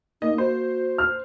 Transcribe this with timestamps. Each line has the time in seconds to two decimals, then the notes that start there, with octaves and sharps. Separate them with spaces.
0.22 A#3 D#4 D#5
0.38 F#4 C5
0.98 F6